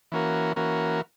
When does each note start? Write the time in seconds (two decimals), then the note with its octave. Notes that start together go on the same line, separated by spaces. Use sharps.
0.12 E3 A#3 C#4 F#4 A#4
0.56 E3 A#3 C#4 F#4 A#4